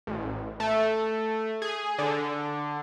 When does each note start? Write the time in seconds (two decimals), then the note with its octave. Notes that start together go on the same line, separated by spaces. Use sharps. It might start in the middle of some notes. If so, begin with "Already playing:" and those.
0.07 A1
0.60 A3
1.62 G#4
1.98 D3